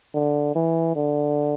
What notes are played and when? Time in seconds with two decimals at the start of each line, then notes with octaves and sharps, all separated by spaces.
0.14 D3
0.55 E3
0.96 D3